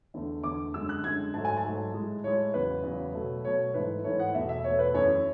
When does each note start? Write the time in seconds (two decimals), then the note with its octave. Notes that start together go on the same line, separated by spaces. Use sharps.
0.14 E2 D3 A3
0.43 E2 D3 A3 D6
0.74 F#2 D3 G#3 E6
0.89 F#6
1.04 F#2 D3 G#3 G#6
1.34 G#2 F#3 A3 A5
1.45 G#5
1.57 A5
1.64 G#2 F#3 A3
1.94 A2 G#3
2.24 A2 G#3 C#5
2.54 E2 C#3 F#3 B4
2.83 E2 C#3 F#3
3.14 B2 F#3 A3
3.44 B2 F#3 A3 C#5
3.74 G#2 E3 A3 B4
4.04 G#2 E3 A3 C#5
4.19 F#5
4.34 E2 B2 A3 E5
4.49 E5
4.64 E2 B2 A3 C#5
4.79 B4
4.94 F#2 E3 A3 C#5